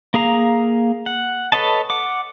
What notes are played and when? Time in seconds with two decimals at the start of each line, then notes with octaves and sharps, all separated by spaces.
0.14 A#3 G#4 F5 A#5
1.06 F#5
1.52 A4 B4 C#5 D#5 A5
1.90 F#5 D6